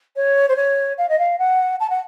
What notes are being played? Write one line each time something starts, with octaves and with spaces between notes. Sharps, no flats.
C#5
C5
C#5
F5
D#5
F5
F#5
A5
F#5